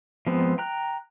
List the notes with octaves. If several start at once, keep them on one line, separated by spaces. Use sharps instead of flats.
F3 G#3 B3 C4
G5 A#5 F#6